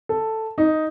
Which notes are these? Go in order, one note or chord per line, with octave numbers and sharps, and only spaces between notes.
A4
D#4